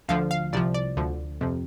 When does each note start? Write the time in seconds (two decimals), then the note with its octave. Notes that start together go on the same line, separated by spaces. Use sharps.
0.08 D2 D3 F3 F5
0.31 F5
0.53 C2 C3 F3 D5
0.74 D5
0.97 D2 D3 F3
1.41 F2 C3 F3